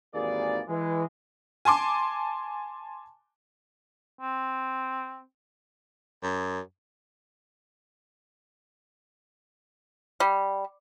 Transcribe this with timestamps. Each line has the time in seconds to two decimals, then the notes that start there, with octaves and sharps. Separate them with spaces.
0.15 G#1 D#2 E3 A#3 G#4 D5
0.68 E3 G#3
1.65 G#5 A5 C6 D6
4.19 C4
6.23 F#2
10.20 G3